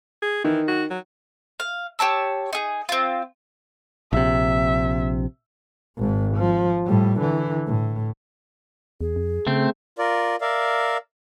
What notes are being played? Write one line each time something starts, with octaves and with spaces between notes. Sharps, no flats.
G#4
D#3 E3
F#4
F#3
F5
G4 C#5 A5 E6
D#4 G#4
C4 F4
A#1 C3 E5
G#1 G#2
F3
A2 G3
D3 E3
A2
E2 G#4
F2
C#3 A3 C4
F4 A#4 D5
A#4 D5 E5 F5